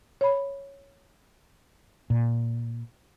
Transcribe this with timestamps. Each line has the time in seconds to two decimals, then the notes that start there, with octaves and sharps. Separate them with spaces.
0.21 C#5 B5
2.10 A#2